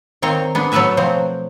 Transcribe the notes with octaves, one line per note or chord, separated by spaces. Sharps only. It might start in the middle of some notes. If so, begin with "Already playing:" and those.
D#3 A#3 C4 C#5 G5
B3 D4 G#4
F#3 A3 B3 B4 E5 G#5
B2 F3 F#3 C4